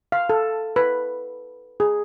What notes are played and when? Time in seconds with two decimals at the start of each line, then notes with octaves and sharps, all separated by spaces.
0.12 F5
0.30 A4
0.76 B4
1.80 G#4